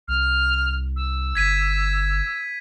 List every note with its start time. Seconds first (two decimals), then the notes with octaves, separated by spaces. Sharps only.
0.08 C2 F6
0.96 E6
1.35 G1 G#6 B6 D#7